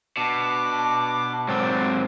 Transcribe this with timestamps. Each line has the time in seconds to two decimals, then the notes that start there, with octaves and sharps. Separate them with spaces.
0.17 B2 D4 D6
1.48 G#2 F#3 C4 D5